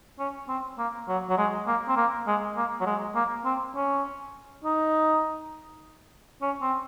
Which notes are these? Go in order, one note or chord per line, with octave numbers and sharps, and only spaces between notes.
C#4
C4
A#3
F#3
F#3
G#3
A#3
C4
A#3
G#3
A#3
F#3
G#3
A#3
C4
C#4
D#4
C#4
C4